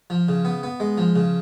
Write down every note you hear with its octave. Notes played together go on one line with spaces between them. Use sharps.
F3
C#3
B3
B3
G#3
F3
C#3